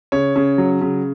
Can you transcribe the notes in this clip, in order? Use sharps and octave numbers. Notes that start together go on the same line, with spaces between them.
C#3 C#5
C#3
F#3
C#3